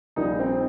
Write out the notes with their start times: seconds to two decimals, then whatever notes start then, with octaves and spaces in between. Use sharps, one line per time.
0.16 A#1 A#2 G3 D#4
0.39 C4